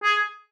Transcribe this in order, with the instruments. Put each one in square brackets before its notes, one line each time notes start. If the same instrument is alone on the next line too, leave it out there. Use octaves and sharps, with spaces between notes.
[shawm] G#4